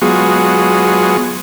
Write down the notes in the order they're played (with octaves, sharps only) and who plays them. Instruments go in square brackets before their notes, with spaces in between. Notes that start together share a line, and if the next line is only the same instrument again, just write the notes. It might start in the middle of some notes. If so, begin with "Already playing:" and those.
[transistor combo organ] F#3 G#3 B3 F4 F#4 G#4